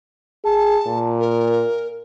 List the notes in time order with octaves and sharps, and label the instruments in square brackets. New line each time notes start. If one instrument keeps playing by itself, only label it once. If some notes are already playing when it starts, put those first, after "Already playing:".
[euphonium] G#4 [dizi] A5
[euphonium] A#2
[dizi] A#4